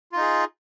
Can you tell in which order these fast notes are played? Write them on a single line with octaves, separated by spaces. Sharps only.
F4 D#4 G#4